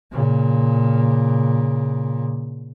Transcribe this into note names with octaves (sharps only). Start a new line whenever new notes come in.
A#2 C#3